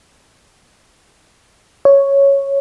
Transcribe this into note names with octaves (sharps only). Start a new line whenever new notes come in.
C#5